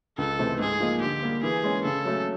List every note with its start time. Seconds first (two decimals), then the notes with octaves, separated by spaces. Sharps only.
0.18 C#2 A4
0.39 C3 E3 A3 C4
0.59 G#2 G#4
0.80 F3 A#3 D#4
1.01 D3 G4
1.23 G3 A#3
1.43 E3 G#4
1.64 G#3 C#4
1.85 C#3 A4
2.05 F#3 A3 C#4